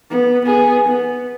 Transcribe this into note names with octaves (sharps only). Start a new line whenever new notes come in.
B3
B3 G#4
B3